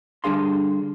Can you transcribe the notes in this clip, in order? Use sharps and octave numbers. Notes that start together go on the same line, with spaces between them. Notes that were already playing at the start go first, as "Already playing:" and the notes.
D3 G3 D4 G#4 F5 C6